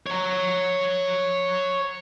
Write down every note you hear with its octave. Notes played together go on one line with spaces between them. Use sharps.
C#5 A#5